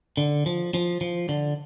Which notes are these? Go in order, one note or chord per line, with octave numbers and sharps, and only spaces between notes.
D3
F3
F3
F3
D3